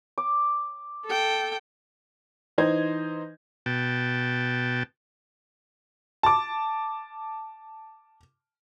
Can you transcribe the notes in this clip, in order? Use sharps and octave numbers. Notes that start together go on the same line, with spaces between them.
D6
A4 G5
E3 D#4 C5 G#6
B2 G5 A5
A5 D6